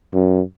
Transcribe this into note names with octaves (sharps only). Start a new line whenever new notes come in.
F#2